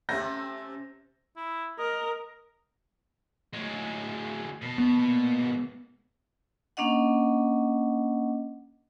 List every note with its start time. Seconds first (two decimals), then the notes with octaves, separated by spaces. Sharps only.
0.09 C3 A3 C#4 G6 A#6
1.37 E4
1.79 A#4 D#5
3.53 D2 A2 F#3 G#3
4.62 D#2 B2 A5
4.78 B3
4.99 A#2
5.38 D#2 G#2
6.77 A#3 C#4 D4 D#5 F#5